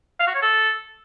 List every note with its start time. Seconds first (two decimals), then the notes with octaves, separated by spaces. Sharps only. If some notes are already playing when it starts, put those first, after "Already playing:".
0.20 F5
0.27 F#4
0.35 C#5
0.42 A4